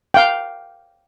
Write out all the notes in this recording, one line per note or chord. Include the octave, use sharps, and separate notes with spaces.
F5 G5